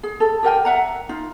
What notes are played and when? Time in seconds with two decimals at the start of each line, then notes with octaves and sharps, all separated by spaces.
0.03 G#4
0.20 A4
0.43 G4 A#4 G5 G#5
0.65 E5 F#5 A#5
1.09 D#4 F4